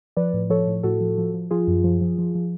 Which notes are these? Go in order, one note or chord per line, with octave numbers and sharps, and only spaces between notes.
F3 B4 D5
A2
F3 A4 C#5
A2
A2 F#4 A4
F3
F3
F3
F3 F4 G#4
F#2
F3
F3
F3
F3